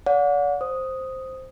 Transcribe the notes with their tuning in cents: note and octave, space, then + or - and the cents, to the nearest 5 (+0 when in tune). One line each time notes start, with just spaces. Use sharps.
D5 -40 F#5 -35
C5 +0 D#6 +0